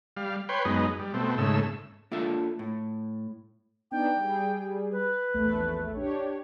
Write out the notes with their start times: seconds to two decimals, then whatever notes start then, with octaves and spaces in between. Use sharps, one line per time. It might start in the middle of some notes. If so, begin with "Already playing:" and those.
0.17 G3 F5
0.49 B4 C#5 G5 C6
0.65 F#2 G#3 B3 D#4
0.99 G3
1.14 B2 A3 C4
1.38 G#2 C#3 A3 E6
2.12 A#3 D4 F4 A4 E5 A5
2.59 A2
3.91 B3 D4 D#4 G5
4.17 G3 G#4
4.92 B4
5.34 A#1 E2 A3
5.93 D4 G4 C#5